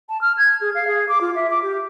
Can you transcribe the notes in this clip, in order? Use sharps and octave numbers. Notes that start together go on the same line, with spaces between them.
A5
F6
G#6
G#4
F5
G#4
D6
F4
E5
D6
G4